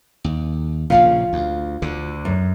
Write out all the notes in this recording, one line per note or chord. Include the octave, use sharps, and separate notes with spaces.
D#2
A#1 A#2 C#3 F4 F5
D2
D2 D3
F#2